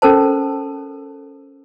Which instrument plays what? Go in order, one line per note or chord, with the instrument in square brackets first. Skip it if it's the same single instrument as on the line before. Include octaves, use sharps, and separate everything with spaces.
[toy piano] C#4 A4 A#4 C5 A5